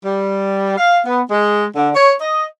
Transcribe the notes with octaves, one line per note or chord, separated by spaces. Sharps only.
G3
F5
B3
G#3
D3
C#5
D#5